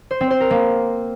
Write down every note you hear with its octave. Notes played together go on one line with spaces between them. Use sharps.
C5
C4
C5
A#4
A#3